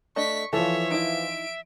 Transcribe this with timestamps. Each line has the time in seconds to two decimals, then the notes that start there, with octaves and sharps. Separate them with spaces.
0.16 A3 D4 D#5 C#6 B6
0.53 E3 F3 A4 C#5 E5
0.91 D#4 E4 D7